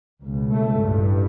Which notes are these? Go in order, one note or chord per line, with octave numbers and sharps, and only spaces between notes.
C#2 B2
A3
A1 G2